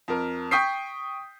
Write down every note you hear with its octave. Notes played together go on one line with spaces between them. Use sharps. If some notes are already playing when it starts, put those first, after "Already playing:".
F2 A#4
G5 C#6 D#6 G6 B6 C7